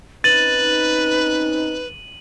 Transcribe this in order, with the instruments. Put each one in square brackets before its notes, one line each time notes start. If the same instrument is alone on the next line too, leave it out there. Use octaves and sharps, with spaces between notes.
[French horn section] C4 C#4 D#4 [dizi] B4 [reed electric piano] A6 [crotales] D#7 F#7